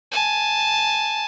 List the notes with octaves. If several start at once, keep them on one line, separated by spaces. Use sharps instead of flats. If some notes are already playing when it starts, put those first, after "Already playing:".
G#5 A5